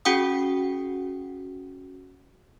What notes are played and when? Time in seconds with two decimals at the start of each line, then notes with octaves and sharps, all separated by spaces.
0.05 C#4 F#4 G#4 F#5 G5 D#6